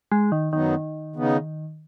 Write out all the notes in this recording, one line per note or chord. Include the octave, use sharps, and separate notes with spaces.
G#3
D#3
F#2 D#3 F#3 B3 D#4
C#3 B3 D#4